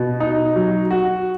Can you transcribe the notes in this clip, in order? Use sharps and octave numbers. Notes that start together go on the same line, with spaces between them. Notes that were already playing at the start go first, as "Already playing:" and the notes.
Already playing: B2
D#4
F#3
F#4